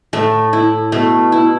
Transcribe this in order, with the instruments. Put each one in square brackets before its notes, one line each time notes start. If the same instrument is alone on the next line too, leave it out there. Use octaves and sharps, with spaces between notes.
[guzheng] A2 [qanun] A3
[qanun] E4
[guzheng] B2 [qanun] A3
[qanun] E4